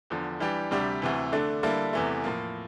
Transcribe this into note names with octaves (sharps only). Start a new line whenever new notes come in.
E2 D3 F3
E3 G3 D4 G4
D2 C3 G3 D4 G4
D2 C3 E3
D3 A3 D4
D3 G3 A#3 E4 A4
E2 C3 E3 A3
A2 F3 A#3